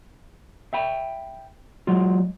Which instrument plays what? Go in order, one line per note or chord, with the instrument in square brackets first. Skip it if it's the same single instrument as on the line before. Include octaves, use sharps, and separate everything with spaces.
[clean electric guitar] E5 G5 B5
F#3 G#3 F4